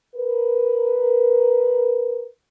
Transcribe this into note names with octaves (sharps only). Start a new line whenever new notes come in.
A#4 B4